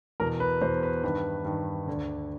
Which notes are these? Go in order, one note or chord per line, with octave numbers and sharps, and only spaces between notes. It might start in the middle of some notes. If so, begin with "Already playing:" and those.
E2 B2 A#4
B4
E2 B2 C5
B4
G2 D#3 B4
G2 D#3
D2 D3